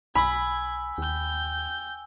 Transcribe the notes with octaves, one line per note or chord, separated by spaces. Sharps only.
B1 G#5 B5 E6 G#6
D#2 G5 G6